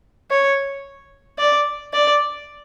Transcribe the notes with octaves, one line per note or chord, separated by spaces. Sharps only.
C#5
D5
D5